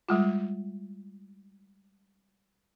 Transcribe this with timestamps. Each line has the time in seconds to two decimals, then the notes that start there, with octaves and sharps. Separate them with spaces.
0.09 G3 G#3 F4